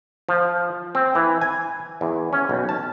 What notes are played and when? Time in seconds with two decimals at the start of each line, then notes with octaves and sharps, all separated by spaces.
0.29 F3
0.95 C4
1.15 E3
1.41 G#5
2.01 E2
2.33 C#4
2.49 B1
2.69 A5